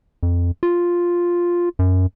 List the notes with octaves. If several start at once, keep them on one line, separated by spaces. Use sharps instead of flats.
F2
F4
F#2